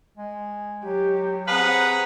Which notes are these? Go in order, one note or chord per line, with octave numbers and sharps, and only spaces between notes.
G#3
F#3 G4
C4 G#4 B4 F#5 A#5